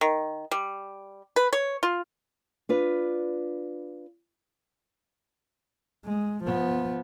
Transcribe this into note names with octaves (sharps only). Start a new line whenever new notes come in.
D#3
G3
B4
C#5
F4
D4 F4 B4
G#3
F3 B3